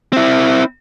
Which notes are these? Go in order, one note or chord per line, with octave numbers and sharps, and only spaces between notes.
C4 E4